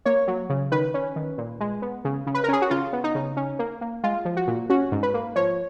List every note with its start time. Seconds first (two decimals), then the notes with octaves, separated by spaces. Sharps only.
0.05 A#3 C#5
0.28 F#3
0.49 C#3
0.71 D#3 B4
0.94 C#4
1.16 D#3
1.38 A#2
1.60 G#3
1.82 B3
2.05 C#3
2.27 C#3
2.34 B4
2.44 A#4
2.48 C#4 G#4
2.62 F#4
2.70 C#3 F4
2.93 B3
3.04 D#4
3.15 C#3
3.37 C#4
3.59 A#3
3.81 A#3
4.04 G#3 F4
4.25 F3
4.37 F#4
4.47 A#2
4.70 C#4 F#4
4.92 G#2
5.03 B4
5.14 A#3
5.36 F3 C#5